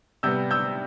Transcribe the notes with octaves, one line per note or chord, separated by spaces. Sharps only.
C3 G3 B3 E6 G6
E6 G6